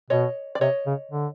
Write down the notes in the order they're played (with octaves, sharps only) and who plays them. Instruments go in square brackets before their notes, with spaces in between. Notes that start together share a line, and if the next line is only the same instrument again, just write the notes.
[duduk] B2 [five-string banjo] C#5 D#5
[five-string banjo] D5
[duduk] C3 [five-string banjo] C#5 D#5
[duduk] C#3
D3